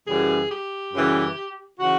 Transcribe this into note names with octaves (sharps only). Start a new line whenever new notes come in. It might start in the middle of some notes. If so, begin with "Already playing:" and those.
F#2 C#3 E3 G3 G#4
G4
F#2 C#3 E3 G3
C#3 E3 F#4